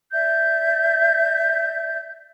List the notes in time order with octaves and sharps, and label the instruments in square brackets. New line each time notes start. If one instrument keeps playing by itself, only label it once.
[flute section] D5 E5 G6